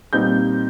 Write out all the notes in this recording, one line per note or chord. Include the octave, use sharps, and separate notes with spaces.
A#2 G3 C4 D#4 G6